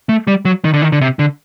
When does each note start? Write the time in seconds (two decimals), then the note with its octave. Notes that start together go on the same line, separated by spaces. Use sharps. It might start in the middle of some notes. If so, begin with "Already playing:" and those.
0.09 A3
0.27 G3
0.45 F#3
0.64 D#3
0.74 D3
0.82 D#3
0.92 D3
1.01 C3
1.19 D3